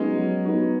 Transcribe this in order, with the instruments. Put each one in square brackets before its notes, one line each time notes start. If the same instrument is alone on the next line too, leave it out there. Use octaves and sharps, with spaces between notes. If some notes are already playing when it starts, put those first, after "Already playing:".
Already playing: [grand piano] F#3 B3 D#4 F#4 [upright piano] G#3 C#4
[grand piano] F#3
B3 D#4 F#4